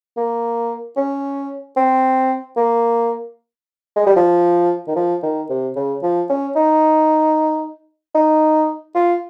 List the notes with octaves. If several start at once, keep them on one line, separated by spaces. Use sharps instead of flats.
A#3
C#4
C4
A#3
G#3
G3
F3
D#3
F3
D#3
C3
C#3
F3
C#4
D#4
D#4
F4